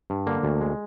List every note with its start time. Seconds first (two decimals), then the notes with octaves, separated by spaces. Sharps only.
0.10 G2
0.27 D3 A#3
0.43 D2
0.61 G#3